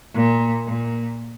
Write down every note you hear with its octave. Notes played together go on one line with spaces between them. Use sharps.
A#2
A#2